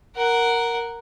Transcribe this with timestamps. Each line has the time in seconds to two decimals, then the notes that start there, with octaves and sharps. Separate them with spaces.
0.16 A#4 F#5